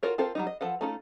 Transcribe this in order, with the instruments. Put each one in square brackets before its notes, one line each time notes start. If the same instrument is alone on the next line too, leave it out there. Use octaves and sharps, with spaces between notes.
[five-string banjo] F4 F#4 A4 A#4 C#5
C4 F4 A4 A#4 C5
F#3 G3 D#4
D#5
F3 A4 B4 F#5
A3 C#4 D#4 F4 A4